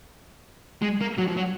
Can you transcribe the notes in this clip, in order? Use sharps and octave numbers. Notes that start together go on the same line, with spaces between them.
G#3
A#3
F#3
F3
F#3